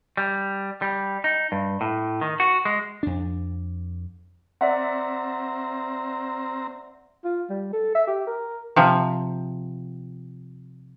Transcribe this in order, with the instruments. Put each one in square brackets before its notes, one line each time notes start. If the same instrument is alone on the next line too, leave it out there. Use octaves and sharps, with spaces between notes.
[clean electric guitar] G3
G3
D#4
G2
A2
D#3
F#4
G#3
[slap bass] F2 D4
[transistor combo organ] C4 A#5 [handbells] D5 E5 F#5
[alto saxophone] F4
G3
A4
E5
G4
A#4
[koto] C3 F3